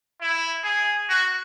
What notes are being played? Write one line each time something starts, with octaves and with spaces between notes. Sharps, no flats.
E4
G#4
F#4